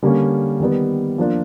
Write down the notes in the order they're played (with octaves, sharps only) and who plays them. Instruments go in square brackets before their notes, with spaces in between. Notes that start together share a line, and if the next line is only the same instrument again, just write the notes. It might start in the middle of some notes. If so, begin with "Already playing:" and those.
[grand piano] D3 G3 A#3 C#4
D#3 G3 B3
F3 A#3 D4 F4